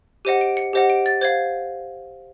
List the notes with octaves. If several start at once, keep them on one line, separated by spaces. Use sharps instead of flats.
G4 C5 D#5 F#5 D#7
D7
C#7
G4 C5 D#5 F#5
D7
A6
C5 F5 G#6